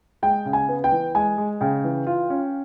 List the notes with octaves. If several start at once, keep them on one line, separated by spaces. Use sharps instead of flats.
G#3 G5
C#3
G#5
B3
G5
E3
G#3 G#5
G#3
C#3 G5
E3
F4
C#4